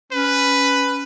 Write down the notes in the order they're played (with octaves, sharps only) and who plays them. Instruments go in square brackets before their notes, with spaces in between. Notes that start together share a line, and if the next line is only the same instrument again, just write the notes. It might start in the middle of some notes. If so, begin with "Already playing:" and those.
[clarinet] C#4 [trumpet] B4